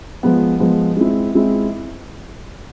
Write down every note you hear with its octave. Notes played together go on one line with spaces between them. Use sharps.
F3 G#3 B3
F3 G#3 B3
G#3 C4 E4
G#3 C4 E4